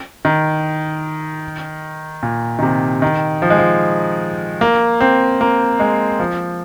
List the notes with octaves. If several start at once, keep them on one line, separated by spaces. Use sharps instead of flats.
D#3
A#2
D#3
C3
D#3
F3
G#3
F3
A#3
C4
A#3
G#3
F3